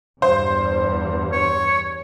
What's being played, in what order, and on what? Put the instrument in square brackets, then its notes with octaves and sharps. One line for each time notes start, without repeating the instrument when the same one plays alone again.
[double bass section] E2 G2 [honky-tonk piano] C5
[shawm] C#5